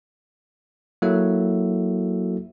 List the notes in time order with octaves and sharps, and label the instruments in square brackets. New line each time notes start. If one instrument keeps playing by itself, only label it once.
[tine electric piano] F#3 A#3 E4 F#4 A4 E5